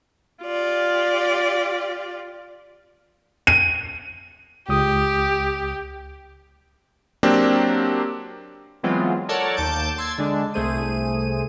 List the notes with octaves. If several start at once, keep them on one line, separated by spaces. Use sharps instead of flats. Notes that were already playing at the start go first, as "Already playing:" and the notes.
F4 G4 D5
D#7
C#2 G4 D#6
F#3 A#3 C4 D4 G4
E3 F#3 G#3 B3 C4 F4
A4 A#4 C#5 D5 F#5 A5
D#2 A5 D6 G6 D7
A5 C6 E6 G#6
D3 G#3 D4
C2 A3 G#4 C5 D#7